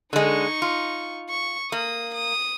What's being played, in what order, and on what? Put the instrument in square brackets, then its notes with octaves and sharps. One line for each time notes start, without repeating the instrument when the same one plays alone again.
[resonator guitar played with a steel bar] D3 G#3 [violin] D#4 C#6
[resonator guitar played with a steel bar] F4
[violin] C#6
[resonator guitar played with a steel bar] A#3 [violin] D#6
[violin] D#6